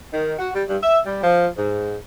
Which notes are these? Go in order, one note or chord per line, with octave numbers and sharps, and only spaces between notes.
D#3
F#4
G3
G2
E5
G3
F3
G#2